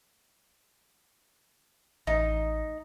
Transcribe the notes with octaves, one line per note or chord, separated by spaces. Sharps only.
A1 D#4